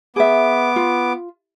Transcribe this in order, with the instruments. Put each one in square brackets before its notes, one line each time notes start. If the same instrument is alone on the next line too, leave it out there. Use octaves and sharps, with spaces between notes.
[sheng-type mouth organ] B3 D6 [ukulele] G#4 E5
[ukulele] F4